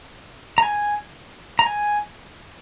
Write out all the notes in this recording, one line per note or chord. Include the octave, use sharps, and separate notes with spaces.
A#5
G#5
A#5
G#5